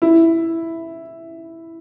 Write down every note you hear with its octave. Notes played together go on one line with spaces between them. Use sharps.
E4